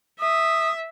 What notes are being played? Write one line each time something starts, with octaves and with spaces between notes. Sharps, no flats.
E5 D#6